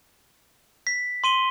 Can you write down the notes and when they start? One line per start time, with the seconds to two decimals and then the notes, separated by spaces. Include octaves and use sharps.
0.87 B6
1.24 C6 D#7 G7